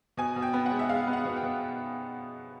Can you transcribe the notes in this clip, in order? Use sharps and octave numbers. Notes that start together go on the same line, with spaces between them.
B2 G#5
B2
G5
B3
F#5
G#3
E5
G#3 F5
B3
F#5
B2
G5
B2